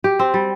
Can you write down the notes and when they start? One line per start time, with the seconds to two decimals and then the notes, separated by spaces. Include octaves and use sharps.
0.04 G4
0.19 C4
0.34 G3